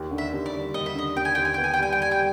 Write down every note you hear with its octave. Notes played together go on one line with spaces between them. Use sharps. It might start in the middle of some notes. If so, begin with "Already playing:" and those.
Already playing: D#2
D3
E5
D#2
D5
G3
D#2 D#5
E5
D3 D#5
D#2 G5
G#5
D#2 G5
G#5
B3 G5
G#5
G5
G3 G#5
G5
G3 G#5
G5